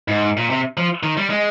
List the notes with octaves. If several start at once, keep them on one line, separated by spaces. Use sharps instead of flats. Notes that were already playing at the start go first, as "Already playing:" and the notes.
G#2
A#2
C3
F3
D#3
G3
G#3